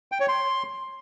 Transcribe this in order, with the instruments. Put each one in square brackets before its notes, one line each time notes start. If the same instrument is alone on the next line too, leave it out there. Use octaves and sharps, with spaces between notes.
[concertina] G5
C#5
C6